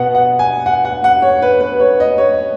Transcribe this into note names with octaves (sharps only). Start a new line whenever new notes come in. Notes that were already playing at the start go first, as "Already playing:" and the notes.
Already playing: B2 B3 F#5
F#5
G#5
F#5
F#5
F#5
C#5
B4
B4
C#5
D#5
C#5